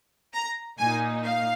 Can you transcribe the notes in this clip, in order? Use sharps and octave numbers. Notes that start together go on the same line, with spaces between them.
A#5
A#2 A#3 D#4 G#5
F5